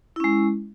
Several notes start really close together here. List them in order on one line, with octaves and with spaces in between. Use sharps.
E4 C#4 G#3